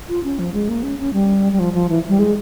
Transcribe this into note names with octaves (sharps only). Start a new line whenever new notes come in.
F4
C#4
F3
G#3
A#3
C#4
C#4
G3
G3
F3
F3
E3
G3
G#3